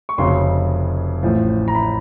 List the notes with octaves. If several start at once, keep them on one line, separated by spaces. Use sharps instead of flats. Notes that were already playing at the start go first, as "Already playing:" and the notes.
C#6
F1 F2 C#3 F#3 C6
A1 A2 F3
A#5
B5